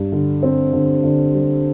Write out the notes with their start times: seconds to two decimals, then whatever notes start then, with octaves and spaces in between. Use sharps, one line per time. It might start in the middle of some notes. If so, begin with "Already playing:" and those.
Already playing: G2
0.12 D3
0.43 C4
0.73 D3
1.04 D3
1.34 G3